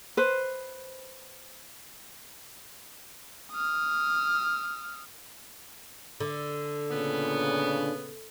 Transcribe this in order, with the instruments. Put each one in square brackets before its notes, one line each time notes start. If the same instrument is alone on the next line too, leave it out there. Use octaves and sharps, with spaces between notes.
[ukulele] B4 C5
[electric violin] D#6 F6
[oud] D3
[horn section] A#2 C#3 B3